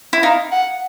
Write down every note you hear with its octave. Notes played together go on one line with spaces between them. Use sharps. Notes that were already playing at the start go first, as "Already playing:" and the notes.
E4
D#4 F5
F#5